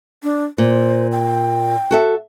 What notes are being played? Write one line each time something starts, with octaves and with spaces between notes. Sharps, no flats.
D4
A#2 C5
G5
F#4 A4 E5